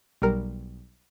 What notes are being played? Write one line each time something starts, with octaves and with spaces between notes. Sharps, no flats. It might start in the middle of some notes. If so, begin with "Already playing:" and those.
B1 G3 A#4